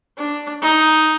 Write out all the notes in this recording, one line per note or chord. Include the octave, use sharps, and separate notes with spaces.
D4
D#4